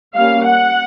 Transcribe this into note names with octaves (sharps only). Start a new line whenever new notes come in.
G3 A#3 C#4 F5
F#5